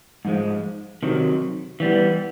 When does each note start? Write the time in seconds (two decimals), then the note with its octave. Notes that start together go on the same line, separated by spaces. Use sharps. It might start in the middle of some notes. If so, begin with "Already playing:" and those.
0.25 G#2 F3 G#3
1.03 C3 D#3 F#3
1.80 E3 G3 B3